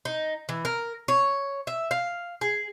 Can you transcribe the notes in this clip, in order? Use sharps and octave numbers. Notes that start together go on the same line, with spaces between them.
D#4
E3
A#4
C#5
E5
F5
G#4